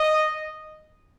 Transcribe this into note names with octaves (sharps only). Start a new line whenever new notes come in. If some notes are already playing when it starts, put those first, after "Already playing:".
Already playing: D#5